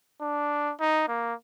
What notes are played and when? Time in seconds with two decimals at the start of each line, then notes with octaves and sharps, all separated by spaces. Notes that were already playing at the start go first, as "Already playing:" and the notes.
0.21 D4
0.80 D#4
1.08 A#3